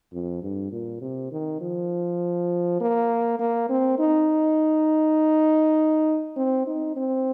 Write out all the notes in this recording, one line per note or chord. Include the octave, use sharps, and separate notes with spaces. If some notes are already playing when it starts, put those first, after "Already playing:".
F2
G2
A#2
C3
D#3
F3
A#3
A#3
C4
D#4
C4
D#4
C4